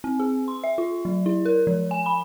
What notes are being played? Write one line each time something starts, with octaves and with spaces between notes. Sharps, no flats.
C4
G#4
C6
E5
F4
F#3
E4
A#4
F3
G#5
B5